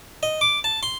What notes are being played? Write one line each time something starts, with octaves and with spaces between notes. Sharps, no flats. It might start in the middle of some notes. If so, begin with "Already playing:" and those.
D#5
D6
A5
C6